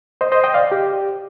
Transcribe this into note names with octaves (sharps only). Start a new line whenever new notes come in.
C5 D#5
C5 D#5
D#5 G5
D5 F5
G4